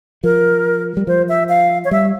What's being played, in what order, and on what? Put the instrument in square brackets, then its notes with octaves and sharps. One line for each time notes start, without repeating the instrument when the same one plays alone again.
[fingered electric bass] F3 [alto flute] A#4
[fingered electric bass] G3
[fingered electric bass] F3 [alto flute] C5
[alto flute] E5
F5
C#5
[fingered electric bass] G3 [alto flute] E5